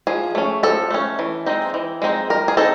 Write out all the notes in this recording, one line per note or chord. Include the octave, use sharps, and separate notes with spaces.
F3 G#4
A3 C#4
F3 A4
A3 C#4
E3
G#3 C4 D#4
E3
G#3 C4 D#4
G3 A#4
G#4
C4 D#4 A4